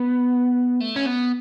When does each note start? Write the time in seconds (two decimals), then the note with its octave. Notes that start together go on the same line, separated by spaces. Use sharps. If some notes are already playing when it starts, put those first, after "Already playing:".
Already playing: B3
0.81 A3
0.96 C#4
1.06 B3